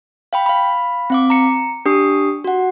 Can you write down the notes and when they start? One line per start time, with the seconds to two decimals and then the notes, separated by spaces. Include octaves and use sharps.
0.33 F5 G5 B5
0.46 F5 B5
1.10 C4 F5 D6
1.30 A#5 C#7
1.86 D4 G4 D#6 C7
2.44 F#4 F#5